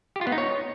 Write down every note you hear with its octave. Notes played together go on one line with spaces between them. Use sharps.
G4
F4
B3
D#4
C#5